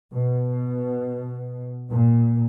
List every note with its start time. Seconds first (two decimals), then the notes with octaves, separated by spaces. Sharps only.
0.12 B2
1.91 A#2